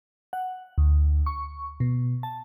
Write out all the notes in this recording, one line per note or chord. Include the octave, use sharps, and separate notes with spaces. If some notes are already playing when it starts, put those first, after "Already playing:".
F#5
D2
C#6
B2
A5